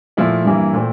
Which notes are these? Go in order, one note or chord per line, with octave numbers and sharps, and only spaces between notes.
A#2 F3 A3 E4
G2 E3 A#3
A#2 A3 C4